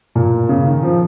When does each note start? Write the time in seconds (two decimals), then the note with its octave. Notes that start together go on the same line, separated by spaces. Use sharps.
0.15 A#2
0.49 C#3
0.67 D#3
0.83 F3